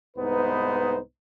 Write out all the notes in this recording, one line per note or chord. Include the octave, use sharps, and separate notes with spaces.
C2 G#2 B3 D#4 B4 C5